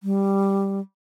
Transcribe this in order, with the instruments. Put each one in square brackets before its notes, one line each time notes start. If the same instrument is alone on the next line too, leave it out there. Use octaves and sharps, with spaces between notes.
[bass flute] G3